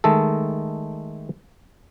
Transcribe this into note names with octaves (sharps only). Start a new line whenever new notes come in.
D#3 G#3 A3 A4